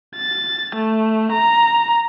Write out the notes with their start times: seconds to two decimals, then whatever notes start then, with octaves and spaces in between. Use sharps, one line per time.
0.16 A6
0.75 A3
1.32 A#5